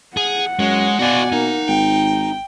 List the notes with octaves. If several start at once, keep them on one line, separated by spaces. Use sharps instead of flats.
G#4 F#5
F#2 G#3 C#5
B2 F#4 D5 F5 G#5
A#3 D#4
G#1 G5